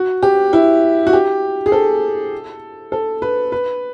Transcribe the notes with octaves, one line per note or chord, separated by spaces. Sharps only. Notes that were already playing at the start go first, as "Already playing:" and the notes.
Already playing: F#4
G4
E4
F#4
G4
G#4
A4
A4
B4
B4